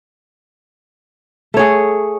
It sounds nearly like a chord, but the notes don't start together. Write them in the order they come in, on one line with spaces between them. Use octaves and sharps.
A3 C#5 G#4